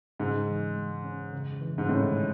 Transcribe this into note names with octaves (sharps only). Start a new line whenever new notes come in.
G#2 C#3
E3
G#3
C#4
C#3
E3
G#2
A2 G#3
C#4